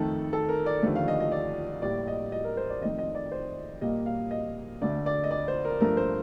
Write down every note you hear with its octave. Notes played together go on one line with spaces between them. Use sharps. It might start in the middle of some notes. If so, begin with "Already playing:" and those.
Already playing: F2 D#3 A3 A4
A4
A#4
D5
D#2 D3 F3 A3
F5
D#5
D#5
D5
A2 G3 A#3 D5
D#5
D#5
A#4
C5
D5
F2 D#3 A3 D#5
D#5
D5
C5
A#2 G3 A#3 D#5
F5
D#5
D2 D3 A3 D5
D5
D#5
D5
C5
A#4
G2 F3 A3 A#4
C5